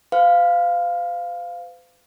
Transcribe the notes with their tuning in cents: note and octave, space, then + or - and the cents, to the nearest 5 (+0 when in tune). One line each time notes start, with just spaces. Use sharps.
B4 +45 F5 +0